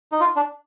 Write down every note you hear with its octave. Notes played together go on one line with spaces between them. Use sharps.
D#4
F4
D4